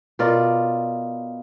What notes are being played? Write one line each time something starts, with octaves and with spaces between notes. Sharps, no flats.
B2 F4 A#4 D5